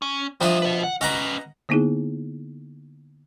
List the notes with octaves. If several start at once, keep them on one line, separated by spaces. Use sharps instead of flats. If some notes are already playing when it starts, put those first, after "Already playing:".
C#4
F3 G3 D4 D#5 E5
B4 D#5
F#5
C#4 B4 D#5 F#5 A#5
D3 A#3 B3 D#4 E4 G#4